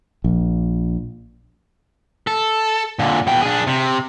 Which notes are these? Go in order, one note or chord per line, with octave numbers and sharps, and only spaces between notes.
A#1
A4
A#2 D3
B2 G5
D4 G#4
C3